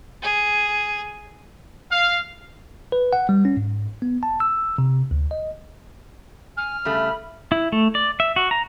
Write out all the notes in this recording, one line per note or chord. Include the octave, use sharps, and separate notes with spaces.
G#4
F5
B4
F#5
G3
C#4
G#2
B3
A5
E6
C3
D2
D#5
G#5 F6
C#3 G3 A3 B5
E4
A3
D5
E5
F#4
A#5